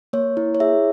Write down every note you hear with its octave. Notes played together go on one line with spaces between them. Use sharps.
A#3 C#5
E4
C#5
G#4 E5